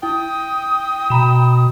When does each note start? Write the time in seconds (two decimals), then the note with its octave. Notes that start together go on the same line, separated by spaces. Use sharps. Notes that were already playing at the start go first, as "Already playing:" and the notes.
0.03 E4 G5 D#6
1.10 B2 A#5 B5 E7